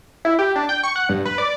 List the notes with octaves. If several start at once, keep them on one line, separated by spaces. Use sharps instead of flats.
E4
G4
D4
G5
C#6
F#5
G2
B4
D5